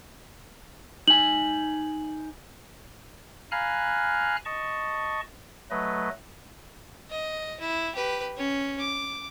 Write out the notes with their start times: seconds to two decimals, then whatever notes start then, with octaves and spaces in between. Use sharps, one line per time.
1.08 D#4 G#5 F#7
3.52 F5 G#5 A#5 B5 F6 F#6
4.45 D#5 A5 C#6
5.71 F#3 A3 B4 D#5
7.10 D#5
7.60 E4
7.95 G4 B4
8.37 C#4
8.80 D6